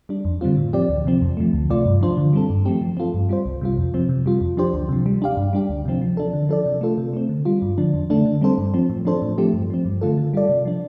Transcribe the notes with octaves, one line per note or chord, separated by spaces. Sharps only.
G3 D4
F2
D3 G3 C4 F4
A2
F3 C4 G4 D5
D2
C3 F3 C4
F2
F3 A3
D2
C3 A3 F4 D5
G2
F3 D4 F4 C5
D3
G3 C4 A4
G2
F3 A3 C4 G4
F3
C4 F4 A4
G2
G3 F4 C5
C2
C3 G3 F4
F2
C3 F3 C4
C3
G3 F4
F2
F3 D4 G4 C5
D2
C3 F3
G3
D4 G4 F5
G2
G3 D4 G4
D2
C3 F3 C4
F3
D4 A4
D3
F3 D4 A4 D5
C3
A3 F4 A4
C3
A3 C4
D3
G3 F4
G2
D3 F3 D4
F2
D3 A3 D4 A4
D3
G3 C4 A4 C5
G2
F3 C4
A2
F3 D4 A4 C5
A2
F3 A3 C4 G4
G2
F3 C4
G2
D3 A3 F4 A4
D3
G3 F4 A4 D5
C3
F3 D4